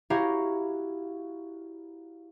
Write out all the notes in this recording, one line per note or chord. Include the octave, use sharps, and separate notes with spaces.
E4 F#4 G4 C#5 F5 A#5